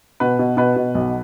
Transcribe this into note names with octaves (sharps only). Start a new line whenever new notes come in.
B2 B4
B2
B2 B4
B2
B1